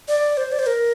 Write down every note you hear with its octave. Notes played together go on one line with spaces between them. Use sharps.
D5
C5
D5
C5
A#4